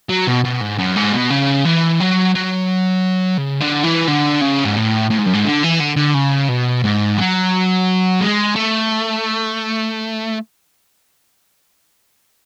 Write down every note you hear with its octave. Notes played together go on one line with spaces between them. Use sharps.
F#3
B2
B2
G#2
F#2
G#2
B2
C#3
E3
F#3
F#3
C#3
D3
E3
D3
C#3
G#2
A2
A2
G#2
F#2
G#2
D3
E3
D3
D3
C#3
B2
G#2
F#3
G#3
A3